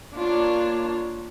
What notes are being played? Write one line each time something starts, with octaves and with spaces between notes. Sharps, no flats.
A#3 D4 F4 C#5